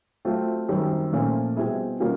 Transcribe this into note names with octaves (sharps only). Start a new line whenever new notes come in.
F#3 A3 C4 F4
F#2 D#3 G3 C4
A#2 F3 A3 C#4 F4
B2 G3 C4 E4 G#4
B2 G3 A#3 C#4 F4